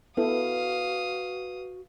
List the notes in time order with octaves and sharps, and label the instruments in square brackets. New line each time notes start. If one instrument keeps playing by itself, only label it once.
[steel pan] B3 E4 A4 [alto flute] F#4 [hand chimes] B4 [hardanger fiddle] F5 D#6